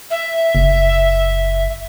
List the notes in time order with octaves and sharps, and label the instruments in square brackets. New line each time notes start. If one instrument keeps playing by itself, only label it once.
[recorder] E5
[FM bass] F#1